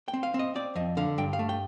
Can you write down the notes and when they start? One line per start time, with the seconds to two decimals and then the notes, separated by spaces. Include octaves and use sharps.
0.08 G5
0.14 C4
0.23 F5
0.34 C4
0.39 D#5
0.55 C4 D5
0.76 F2 D#5
0.97 D3 F5
1.18 G2 G5
1.33 F5
1.39 A3
1.49 G5